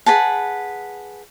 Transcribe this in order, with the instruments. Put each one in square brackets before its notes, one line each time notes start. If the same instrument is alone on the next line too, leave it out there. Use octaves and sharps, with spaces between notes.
[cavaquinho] G#4 B4 F#5 A5